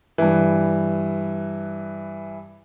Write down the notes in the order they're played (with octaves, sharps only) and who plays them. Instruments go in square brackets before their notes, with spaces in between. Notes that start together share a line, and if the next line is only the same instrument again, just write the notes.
[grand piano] G2 E3